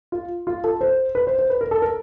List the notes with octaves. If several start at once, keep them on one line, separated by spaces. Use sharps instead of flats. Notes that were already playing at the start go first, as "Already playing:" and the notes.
F4
F4
A4
C5
B4
C5
C5
B4
A#4
A4
A#4